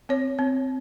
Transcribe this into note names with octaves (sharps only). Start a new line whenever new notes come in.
C4 C#5
C4